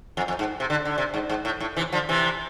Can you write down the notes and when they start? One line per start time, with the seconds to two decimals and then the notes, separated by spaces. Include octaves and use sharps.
0.17 F2
0.28 F2
0.39 G#2
0.60 C3
0.70 D3
0.85 D3
0.98 C3
1.14 G#2
1.30 G#2
1.45 A2
1.60 A2
1.77 C3 E3
1.92 D3 F3
2.09 C3 E3